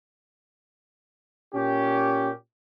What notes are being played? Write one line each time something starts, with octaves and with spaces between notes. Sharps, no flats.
A#2 C#4 G4